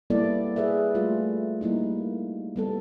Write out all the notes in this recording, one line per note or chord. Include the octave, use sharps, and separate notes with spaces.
G3 A#3 B3 E4 A4 D5
G#4 B4 D5 E5
G3 A3 F4
G3 A#3 D#4 E4
G3 B3 A4